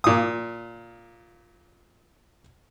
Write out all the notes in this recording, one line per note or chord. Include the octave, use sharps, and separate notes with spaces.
A#2 D#6